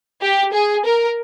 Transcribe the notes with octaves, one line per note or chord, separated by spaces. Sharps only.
G4
G#4
A#4